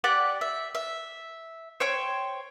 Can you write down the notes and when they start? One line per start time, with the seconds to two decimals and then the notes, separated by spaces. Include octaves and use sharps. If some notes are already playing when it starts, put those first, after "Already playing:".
0.04 G4 D5 F#5 D6
0.41 E5
0.75 E5
1.80 C5 C#5 G5